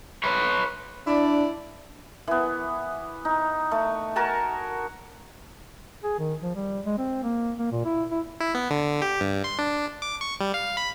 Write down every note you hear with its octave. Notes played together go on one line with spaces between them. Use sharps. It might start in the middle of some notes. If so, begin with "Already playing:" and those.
B4 C#5
D4 E4 D5
E3 B3
D#4
A3
F#4 A#4 G#5 A5
G#4
D#3
F3
G3
G#3
C4
A#3
A#3
A#2
E4
E4
E4
B3
D3
G4
G2
C6
D4
D6
C#6
G3
F5
B5